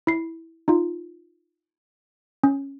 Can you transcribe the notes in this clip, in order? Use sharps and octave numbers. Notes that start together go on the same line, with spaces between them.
E4 C7
D#4 F4
C#4